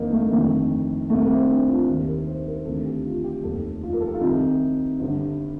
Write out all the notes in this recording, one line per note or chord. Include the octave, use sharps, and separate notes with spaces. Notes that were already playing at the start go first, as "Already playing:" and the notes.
Already playing: G1 F2 C3 D#3 A#3 D#4
A3
G1 F2 D#3 A3
C2 C3 D#3 A3
C4
D4
F4
D#2 D#3 G4
A#4
C5
A#4
D2 C3 D#3 A4
G4
F4
G4
F1 D#2 D#3 A4
F4
A#4
A4
G4
F4
C2 C3 D#3 D#4
G1 G2 D3